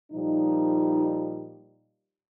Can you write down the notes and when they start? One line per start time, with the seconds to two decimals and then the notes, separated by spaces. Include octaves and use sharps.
0.12 A#2 F3 G3 D#4